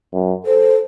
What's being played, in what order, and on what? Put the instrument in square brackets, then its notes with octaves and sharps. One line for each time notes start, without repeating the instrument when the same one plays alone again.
[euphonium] F#2
[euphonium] A4 [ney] C5